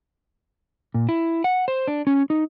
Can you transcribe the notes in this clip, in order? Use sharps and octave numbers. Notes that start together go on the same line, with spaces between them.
A#2
E4
F#5
C5
D4
C#4
D#4